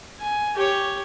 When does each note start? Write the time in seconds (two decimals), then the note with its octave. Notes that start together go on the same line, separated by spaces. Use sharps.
0.21 G#5
0.55 G4 C#5